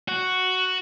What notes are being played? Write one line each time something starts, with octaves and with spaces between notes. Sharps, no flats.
F#4